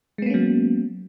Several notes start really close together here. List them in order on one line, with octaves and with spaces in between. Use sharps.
G#3 B3 A#3 C#4 F#3